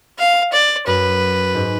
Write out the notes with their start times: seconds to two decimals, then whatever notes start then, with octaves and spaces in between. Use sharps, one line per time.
0.19 F5
0.53 D5
0.86 F#2 B4
1.55 G#2